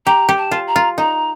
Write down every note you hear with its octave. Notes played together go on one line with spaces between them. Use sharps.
G4 A#5
G4
A5
F4
A#5
F4
D#4 A#5